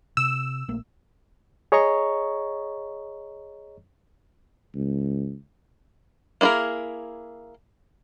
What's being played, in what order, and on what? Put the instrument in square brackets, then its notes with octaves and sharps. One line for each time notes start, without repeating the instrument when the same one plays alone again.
[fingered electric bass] C3 [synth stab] E6
[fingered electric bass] A#1 A3 A#3
[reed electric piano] G#4 C#5 D#5 A#5 C#6
[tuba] C#2
[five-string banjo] A#3 E4 F4 G#4 A#4